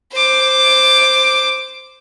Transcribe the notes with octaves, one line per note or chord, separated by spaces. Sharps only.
C5 D6